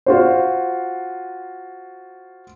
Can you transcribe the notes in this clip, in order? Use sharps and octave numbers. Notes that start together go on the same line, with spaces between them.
F4 F#4 C5